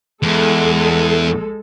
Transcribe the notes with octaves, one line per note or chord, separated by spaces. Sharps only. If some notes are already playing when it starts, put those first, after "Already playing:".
E2 G#3 A4